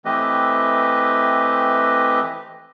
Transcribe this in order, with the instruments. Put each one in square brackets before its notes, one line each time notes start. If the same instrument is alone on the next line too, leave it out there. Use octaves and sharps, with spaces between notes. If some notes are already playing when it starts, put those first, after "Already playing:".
[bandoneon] E3 A3 C4 G4 B4 D#5